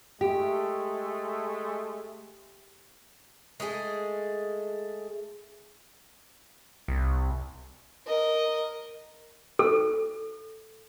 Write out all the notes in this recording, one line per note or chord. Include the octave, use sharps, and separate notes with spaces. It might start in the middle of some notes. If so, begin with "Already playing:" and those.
G#3 A3 G4
G#3 A3 F4 G#4
C2
A#4 D#5
A4